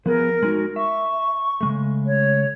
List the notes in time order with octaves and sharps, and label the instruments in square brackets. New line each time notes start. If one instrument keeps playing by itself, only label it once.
[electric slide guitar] F3 B3 G#4 [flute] A#4
[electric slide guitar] G#3 D#4 F#4
[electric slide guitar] E5 [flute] C#6
[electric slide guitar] C#3 G#3 A3
[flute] C#5